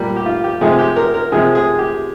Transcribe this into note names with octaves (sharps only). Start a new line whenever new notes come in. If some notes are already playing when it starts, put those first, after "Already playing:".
Already playing: A#2 G3
G4
F4
G4
C3 F3 G#3 G#4
G4
A#4
A#4
C3 F3 G#3 G#4
G#4
G4